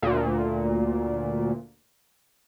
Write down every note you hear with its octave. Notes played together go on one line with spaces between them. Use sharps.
D2 A#2